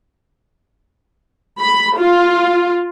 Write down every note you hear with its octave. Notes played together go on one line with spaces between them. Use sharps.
B5
F4